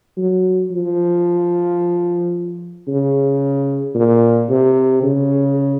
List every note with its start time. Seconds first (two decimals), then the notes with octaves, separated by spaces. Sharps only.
0.17 F#3
0.71 F3
2.87 C#3
3.94 A#2
4.49 C3
5.03 C#3